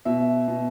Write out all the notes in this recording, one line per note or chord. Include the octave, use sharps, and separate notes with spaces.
B2 E5
B2